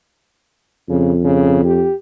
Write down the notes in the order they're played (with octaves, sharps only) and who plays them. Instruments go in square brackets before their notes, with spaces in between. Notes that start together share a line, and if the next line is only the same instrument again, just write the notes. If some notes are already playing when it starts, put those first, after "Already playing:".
[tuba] F2 [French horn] C#3
[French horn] C#3
G4